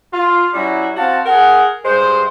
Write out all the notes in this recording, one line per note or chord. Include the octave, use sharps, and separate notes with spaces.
F4
F#3 G3 C#4 E4 F#4
C4 F#4 F5 A5
G#4 A#4 F#5
G2 G#3 C5